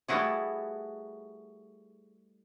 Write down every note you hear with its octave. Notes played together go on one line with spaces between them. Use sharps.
G3 A3 B3 E4 F#4 G#4